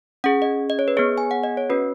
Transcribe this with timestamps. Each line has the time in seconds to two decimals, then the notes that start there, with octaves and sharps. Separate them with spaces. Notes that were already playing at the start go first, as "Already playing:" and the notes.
0.24 C#4 G#4 F#5
0.42 D#5
0.70 D#5
0.79 C#5
0.88 B4
0.97 B3 G#4 C#5
1.18 G#5
1.31 F#5
1.44 D#5
1.57 C#5
1.70 C#4 F#4 B4